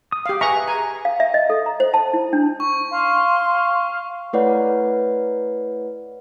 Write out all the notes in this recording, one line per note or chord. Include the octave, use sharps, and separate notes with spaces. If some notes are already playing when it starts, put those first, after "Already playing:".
D#6
G4 F5
G#4 B4 E5 G#5 A#5 C#6
G#5 A#5
F5
E5
D#5
A4
A#5
C5
A5
E4
D4
C#6
F5 C6
A3 E4 B4 C#5 D5 F#5